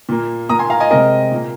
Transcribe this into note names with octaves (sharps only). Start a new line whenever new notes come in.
A#2 A#3
A#2 A#3 A#5 D#6
G#5 C6
F5 A#5
D#5 G#5
C3 G#3 C4 A#4 D#5
A#2 A#3